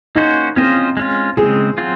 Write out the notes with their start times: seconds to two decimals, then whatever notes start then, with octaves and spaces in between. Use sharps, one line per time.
0.15 A#3 C#4 D#4 F#4 C5
0.56 C4 C#4 F4 C5 D#5
0.97 G#3 C#4 F4
1.37 C#3 G#3 C4 G#4
1.78 F#3 C4 F4